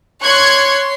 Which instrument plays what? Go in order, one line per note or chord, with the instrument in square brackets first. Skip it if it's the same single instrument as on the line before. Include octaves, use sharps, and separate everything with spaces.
[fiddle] C#5 C6 [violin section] C#6 F#6 G#6